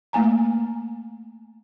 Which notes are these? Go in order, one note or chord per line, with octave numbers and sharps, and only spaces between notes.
A3 A#3 G#5 A#5